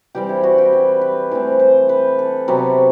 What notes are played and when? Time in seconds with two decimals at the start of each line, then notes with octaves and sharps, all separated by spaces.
0.15 E3 G3 C4 G4
0.29 E4
0.43 F#4
0.58 G4
0.73 B4
1.01 B4
1.31 E3 A3 C4 C5
1.59 C5
1.89 B4
2.19 A4
2.48 C3 F#3 B3